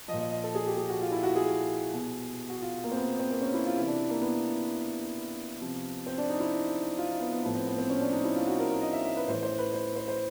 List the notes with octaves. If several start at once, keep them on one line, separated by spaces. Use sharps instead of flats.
F3 D#5
A#2
D#5
D#5
A4
G#4
G4
G#4
F#4
F4
E4
F#4
G#4
B2
F#4
F4
A#3
C4
B3
C4
A#3
C#4
E4
F4
C3 E3 E4
D4
A#3
B3
C3 F3
C4
D4
D#4
E4
F4
D#4
B3
B3
A2 F3 B3
C4
B3
C4
C#4
D4
D#4
E4
F4
F#4
A#4
A#4
D#5
E5
E5
B4
A2 E3 C5
C5
B4
C5
C5
C5